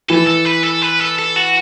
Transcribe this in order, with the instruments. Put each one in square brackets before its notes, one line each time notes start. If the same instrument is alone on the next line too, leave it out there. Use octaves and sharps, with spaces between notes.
[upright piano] E3 [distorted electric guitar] A4
[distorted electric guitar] A4
B4
A4
B4
A4
A4
F#4